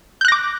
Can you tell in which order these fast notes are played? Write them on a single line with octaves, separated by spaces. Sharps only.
G6 F#6 A#6 D6